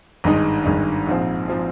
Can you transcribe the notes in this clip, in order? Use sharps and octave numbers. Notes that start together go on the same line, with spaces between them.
G#1 G2 D#3 G#3 D#4
G#1 G2 D#3 G#3 D#4
A#1 G#2 F3 C4
F3 C4